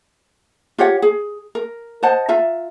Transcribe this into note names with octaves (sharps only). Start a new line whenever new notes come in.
F4 G4 C#5 F#5
G#4
A#4
C5 D#5 F#5 A5
F4 E5 A#5